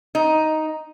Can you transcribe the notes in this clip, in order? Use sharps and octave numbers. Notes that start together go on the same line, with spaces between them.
D#4